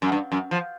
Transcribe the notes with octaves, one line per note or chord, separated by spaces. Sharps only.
F#2
G2
F#2
F3